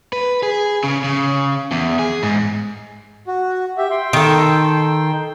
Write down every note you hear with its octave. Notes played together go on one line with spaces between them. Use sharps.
B4
G#4
C#3
C#3
E2
G#4
G#2
F#4
G4 E5
G5 C6
D#3 A4